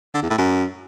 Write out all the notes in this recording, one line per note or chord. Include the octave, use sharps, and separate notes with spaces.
D3
E2
A2
F#2